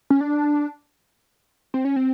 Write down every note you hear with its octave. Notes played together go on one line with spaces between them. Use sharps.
C#4
D4
C4
C#4
C4